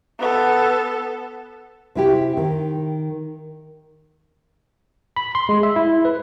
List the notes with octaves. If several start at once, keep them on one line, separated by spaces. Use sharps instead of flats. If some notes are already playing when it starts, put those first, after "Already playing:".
B3 A4
C3 E4 G4
D#3
B5
C6
G#3
E5
E4
B4